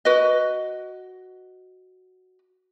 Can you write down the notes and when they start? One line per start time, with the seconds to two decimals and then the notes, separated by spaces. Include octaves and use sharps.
0.05 F#4 B4 D#5